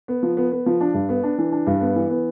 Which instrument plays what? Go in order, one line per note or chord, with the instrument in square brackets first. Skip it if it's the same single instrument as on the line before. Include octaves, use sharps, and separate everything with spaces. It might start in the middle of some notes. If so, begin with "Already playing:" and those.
[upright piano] B3
F3
B3
B3
F3
D4
G2
B3
D4
E3
D4
G2
B3
E3
B3